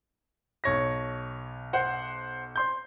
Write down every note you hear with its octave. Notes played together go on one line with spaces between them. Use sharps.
B1 C#5 A#6
C5 F#5
C5 C6 G6